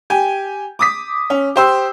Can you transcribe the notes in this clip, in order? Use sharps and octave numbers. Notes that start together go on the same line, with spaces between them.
G4 G#5
D6 D#6 B6
C#4
G4 C5 E6